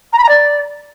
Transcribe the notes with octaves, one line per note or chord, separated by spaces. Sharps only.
A#5
B5
A#5
D5